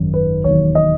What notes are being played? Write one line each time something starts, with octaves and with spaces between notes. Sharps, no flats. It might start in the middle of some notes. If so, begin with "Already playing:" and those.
Already playing: G#1 F#2 D#3 F#3
B4
E1 D#2 D#3 F#3 C#5
D#5